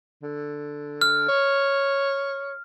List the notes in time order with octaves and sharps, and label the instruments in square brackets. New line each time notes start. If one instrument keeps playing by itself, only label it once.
[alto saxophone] D3
[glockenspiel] F6
[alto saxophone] C#5